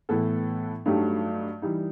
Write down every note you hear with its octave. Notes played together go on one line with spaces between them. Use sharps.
A2 E3 B3 E4 A4
G2 F#3 A3 D#4 G4
E3 G3 D#4